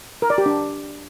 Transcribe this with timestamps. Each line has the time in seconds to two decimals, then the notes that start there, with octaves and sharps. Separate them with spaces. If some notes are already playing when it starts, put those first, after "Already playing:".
0.22 A#4
0.30 D5
0.38 G4
0.46 D4